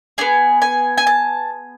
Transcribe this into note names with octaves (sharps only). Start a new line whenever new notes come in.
B3 D4 G#4 G#5
G#5
G#5
A5